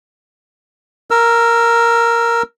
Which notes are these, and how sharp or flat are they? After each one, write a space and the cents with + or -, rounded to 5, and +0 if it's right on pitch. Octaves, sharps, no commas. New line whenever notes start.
A#4 +0 E6 +25